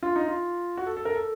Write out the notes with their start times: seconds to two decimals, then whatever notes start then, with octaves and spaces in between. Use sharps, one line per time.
0.03 F4
0.16 D#4
0.27 F4
0.77 F#4
0.87 A4
0.97 A4
1.05 A#4
1.15 A4